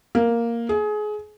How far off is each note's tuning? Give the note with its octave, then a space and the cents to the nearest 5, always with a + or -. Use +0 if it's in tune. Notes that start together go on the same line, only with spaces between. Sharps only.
A#3 +0
G#4 +25